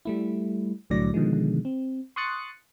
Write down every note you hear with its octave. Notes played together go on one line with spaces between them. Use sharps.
G3 A3 E4
C2 A2 D3 F#3 D5 A#6
B2 D3 D#3 F3 G#3
C4
C6 C#6 D#6 F#6 A6 C#7